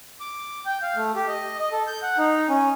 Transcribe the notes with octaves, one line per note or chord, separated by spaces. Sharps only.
D6
G5
F5
A3
G4
D#5
D#5
A4
G6
F#5
D#4
C#4